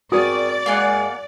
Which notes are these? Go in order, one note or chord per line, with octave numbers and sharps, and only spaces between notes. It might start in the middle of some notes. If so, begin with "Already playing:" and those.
C4 F#4 G#4 A#4 D5 D#6
G#3 A#3 G#4 F#5